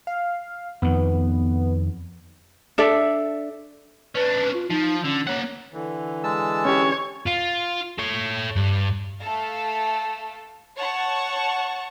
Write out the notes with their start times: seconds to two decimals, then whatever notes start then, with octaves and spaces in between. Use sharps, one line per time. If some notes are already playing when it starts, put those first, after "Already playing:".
0.07 F5
0.82 F2 D#3 B3
2.78 D4 A4 D5 E5
4.15 C#4 D4 B4
4.54 F4
4.70 F3 D#4
5.04 D3 C#4
5.27 A#3 C#5 F#5
5.73 D3 E3
6.24 G#3 A5 E6
6.65 C#4 G4 C#5
7.27 F4
7.99 A4 C#5
8.56 G2
9.22 A3 A4 F5
10.77 C#5 F#5 A5 C#6